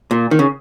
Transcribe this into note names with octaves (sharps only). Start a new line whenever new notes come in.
A#2
D#3
C#3